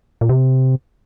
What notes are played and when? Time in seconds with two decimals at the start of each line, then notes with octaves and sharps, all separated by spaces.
0.21 A#2
0.29 C3